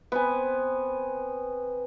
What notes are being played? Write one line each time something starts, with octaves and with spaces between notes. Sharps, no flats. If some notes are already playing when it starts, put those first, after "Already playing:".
B3 C4 G#5